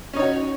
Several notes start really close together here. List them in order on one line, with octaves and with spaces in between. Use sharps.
C#4 D#4 C#5 F#4